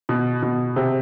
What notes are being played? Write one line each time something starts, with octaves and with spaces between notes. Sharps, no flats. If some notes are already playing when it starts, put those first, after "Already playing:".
B2
B2
C3